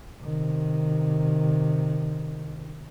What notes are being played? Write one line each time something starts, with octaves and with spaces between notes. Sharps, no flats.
C3 D#3